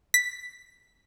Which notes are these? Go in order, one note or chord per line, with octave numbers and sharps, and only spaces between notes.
B6